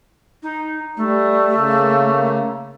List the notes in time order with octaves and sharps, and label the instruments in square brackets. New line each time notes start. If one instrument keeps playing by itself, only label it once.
[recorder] D#4
[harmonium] G3 [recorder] A3
[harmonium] C#3 A#3